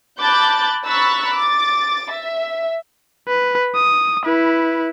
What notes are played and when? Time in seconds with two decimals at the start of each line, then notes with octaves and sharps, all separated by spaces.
0.20 A5 B5 D6 F#6 G6 A6
0.86 A#5 B5 C#6 E6 F#6 A6
1.35 D6 A6
2.11 E5
3.28 B4
3.75 D#6
4.25 E4 B4